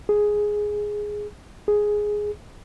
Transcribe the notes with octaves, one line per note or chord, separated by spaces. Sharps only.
G#4
G#4